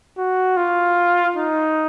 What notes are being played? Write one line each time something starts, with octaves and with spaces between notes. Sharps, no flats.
F#4
F4
D#4